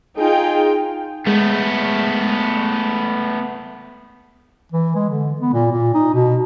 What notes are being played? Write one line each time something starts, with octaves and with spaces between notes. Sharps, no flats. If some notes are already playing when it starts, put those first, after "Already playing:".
D#4 F4 G#4 G5
G#3 A3 B3
E3
G#3
D3
B3
A#2
A#2
D#4
B2